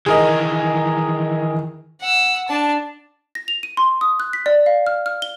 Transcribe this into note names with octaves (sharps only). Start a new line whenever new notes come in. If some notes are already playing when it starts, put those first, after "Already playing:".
D#3 E3 G#4 A#4 D#5
F#5 E6
D4 A5
A#6
F7
D#7
C6
D#6
F#6
B6
D5
F5
F6
F6
G7